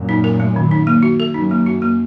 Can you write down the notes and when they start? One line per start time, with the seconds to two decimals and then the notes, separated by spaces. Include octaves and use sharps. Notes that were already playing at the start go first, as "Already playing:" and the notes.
Already playing: F#2 A#2
0.09 D#4
0.24 A#4
0.40 A3
0.56 D#3
0.71 D#4
0.87 A#3
1.03 F#4
1.20 A4
1.34 F#2 D#4
1.51 A#3
1.66 F#4
1.82 A#3